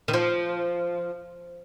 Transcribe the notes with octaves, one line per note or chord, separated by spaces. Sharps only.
D#3
F3